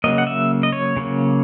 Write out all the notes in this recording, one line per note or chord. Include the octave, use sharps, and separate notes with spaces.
C#3 F#3 A#3 D#5
F#5
E5
D#5
C#5
C#3 F#3 A#3